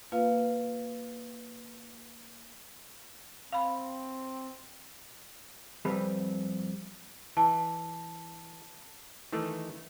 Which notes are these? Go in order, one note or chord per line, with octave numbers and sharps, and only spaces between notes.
A#3 F4 B4 F5
C4 F5 B5
F2 G3 C4 B4
E3 A5
D#3 E3 A3